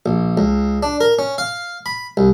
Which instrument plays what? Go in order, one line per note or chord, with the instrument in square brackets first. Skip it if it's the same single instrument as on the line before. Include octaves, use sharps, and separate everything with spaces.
[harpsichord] A#1
C#2
D4
A#4
C#4
F5
B5
C2